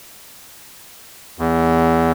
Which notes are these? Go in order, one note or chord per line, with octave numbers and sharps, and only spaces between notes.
E2